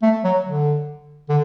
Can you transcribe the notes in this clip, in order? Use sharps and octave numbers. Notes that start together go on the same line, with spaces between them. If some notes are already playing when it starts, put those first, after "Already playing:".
A3
F#3
D3
D3